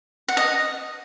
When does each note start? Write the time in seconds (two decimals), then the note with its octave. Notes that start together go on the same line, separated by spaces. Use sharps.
0.28 F#5
0.37 D#5